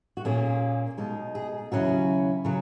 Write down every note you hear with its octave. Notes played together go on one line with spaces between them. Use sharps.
F#4
A#2 A#3 C#4 G#4
B2 G#3 D#4
G#4
D#2 C#3 F#3 C#4 E4 F#4
C#3 F#3